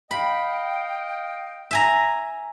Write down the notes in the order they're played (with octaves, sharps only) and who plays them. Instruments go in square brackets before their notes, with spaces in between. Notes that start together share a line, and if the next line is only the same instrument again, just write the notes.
[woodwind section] D#5 F5 G5 [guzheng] B5
[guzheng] E5 G#5 A#5